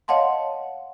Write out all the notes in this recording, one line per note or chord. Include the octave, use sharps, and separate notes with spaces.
C#5 D#5 F5 F#5 A5 C6